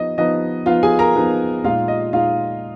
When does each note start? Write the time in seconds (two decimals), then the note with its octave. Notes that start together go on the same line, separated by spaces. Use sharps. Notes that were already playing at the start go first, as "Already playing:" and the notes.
Already playing: F3 B3 D#4 D#5
0.18 F3 B3 D#4 D#5
0.66 F3 B3 D#4 F4 F5
0.83 G#4 G#5
0.99 A#4 A#5
1.16 F3 B3 D#4
1.64 A#2 G#3 D#4 F4 F5
1.88 D#5
2.13 A#2 G#3 D#4 F4 F5